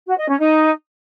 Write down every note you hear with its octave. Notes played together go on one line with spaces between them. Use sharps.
F#4
D#5
C#4
D#4